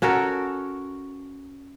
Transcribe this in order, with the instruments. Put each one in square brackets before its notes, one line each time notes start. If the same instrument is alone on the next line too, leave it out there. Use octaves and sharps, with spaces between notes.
[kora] C#4 F#4 A4 A#4